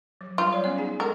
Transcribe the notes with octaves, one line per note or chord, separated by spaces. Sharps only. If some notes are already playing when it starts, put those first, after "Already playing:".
F#3
F#3 G3 F4 C5
C#5 D5 F5
B3 C#4 F5
D#4 G#4 G#5
G#3 A4 A#4